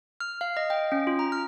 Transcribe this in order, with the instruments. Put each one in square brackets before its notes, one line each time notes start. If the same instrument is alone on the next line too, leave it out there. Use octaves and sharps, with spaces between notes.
[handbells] F6
F5
D#5
G5
C#4
F4
A#5
F6